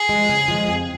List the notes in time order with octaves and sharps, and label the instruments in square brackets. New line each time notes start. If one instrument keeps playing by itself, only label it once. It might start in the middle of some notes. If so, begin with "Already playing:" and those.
Already playing: [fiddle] G#4
[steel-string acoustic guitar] F3 G#3
C#3
F3 G#3
F2